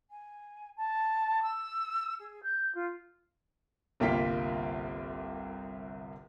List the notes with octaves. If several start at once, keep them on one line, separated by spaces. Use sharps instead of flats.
G#5
A5
E6
G#4
G6
F4
G1 C2 A#3 F4 G5 B6